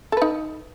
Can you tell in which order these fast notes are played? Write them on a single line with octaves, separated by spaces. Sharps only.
A4 B4 D#4